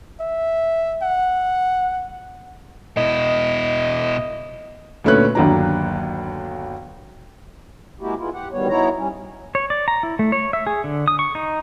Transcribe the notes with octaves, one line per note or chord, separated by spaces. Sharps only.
E5
F#5
B2 E4 D#5
D2 A#2 A3 B3 C#4 F#6
G1 D#2 F#3 D4 A#5
G#3 A#3 E4 F#4 G4
G#3 B3 E4 F4
G4 F#5
D2 D#3 G3 B3 C#5
B2 B3 D#4 E4 C#5 A#5
G3 C#4
C#5
D5
A#5
E4
A3
C#5
E5
G#4
D3
D#6
C#6
D#4